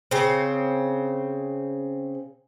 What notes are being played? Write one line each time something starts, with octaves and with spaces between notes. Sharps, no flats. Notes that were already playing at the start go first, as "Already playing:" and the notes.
C#3 C4